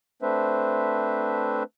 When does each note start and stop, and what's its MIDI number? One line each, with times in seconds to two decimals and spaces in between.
0.22 1.63 57
0.22 1.63 60
0.22 1.63 62
0.22 1.63 71
0.22 1.63 72
0.22 1.63 76